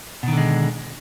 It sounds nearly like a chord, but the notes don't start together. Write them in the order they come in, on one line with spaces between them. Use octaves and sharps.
B2 D#3 D3 G#3